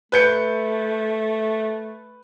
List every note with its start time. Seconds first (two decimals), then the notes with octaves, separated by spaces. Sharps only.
0.12 A3 B4 G6 C#7